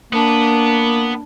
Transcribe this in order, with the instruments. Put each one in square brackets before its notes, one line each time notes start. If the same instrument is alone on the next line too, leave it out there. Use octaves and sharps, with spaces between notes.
[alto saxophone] A#3 [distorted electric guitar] B3 [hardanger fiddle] D4